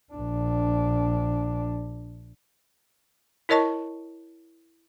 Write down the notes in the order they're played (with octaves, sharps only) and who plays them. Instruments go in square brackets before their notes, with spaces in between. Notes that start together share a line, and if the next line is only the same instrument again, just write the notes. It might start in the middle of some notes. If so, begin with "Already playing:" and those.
[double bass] A#1 D4
[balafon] E4 A#4 C#5 D#5 A5 C#6